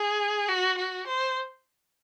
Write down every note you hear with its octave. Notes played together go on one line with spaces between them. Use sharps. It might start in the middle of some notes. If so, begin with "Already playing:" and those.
Already playing: G#4
F#4
F#4
C5